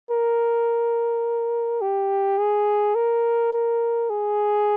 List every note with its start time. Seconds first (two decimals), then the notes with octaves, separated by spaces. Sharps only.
0.11 A#4
1.82 G4
2.39 G#4
2.96 A#4
3.53 A#4
4.10 G#4